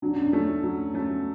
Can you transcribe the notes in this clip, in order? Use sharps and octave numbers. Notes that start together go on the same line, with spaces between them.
F#3 D4
C#4
D4
A3 C#4
F#3
A3 C#4